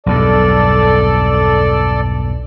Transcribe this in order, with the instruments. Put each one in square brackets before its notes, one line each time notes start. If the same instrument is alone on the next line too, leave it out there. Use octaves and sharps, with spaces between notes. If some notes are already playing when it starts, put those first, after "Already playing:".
[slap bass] B1 E2 G2 [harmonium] A4 D5